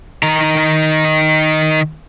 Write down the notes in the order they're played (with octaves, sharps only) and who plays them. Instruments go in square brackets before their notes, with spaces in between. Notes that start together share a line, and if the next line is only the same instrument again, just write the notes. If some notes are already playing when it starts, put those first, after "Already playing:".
[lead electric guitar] D#3 A#5